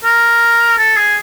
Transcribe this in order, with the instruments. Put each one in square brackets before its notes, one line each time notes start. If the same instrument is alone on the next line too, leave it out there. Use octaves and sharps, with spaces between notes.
[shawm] A#4
A4
G#4